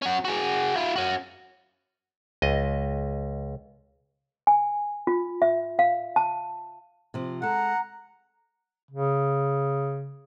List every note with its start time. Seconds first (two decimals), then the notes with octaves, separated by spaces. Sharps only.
0.02 C#4 F#4
0.25 F#4 G#4
0.75 E4 F4
0.96 C#4 F#4
2.42 C#2 D#5
4.47 G#5
5.07 F4
5.42 E5
5.79 F5
6.16 A5
7.14 C3 F3
7.42 G#3 A4 F#5 A#5
8.91 C#3